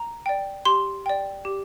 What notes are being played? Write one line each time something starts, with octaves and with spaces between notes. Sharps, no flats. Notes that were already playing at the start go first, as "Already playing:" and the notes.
Already playing: A#5
D5 G5
G4 C6
D5 G5
G4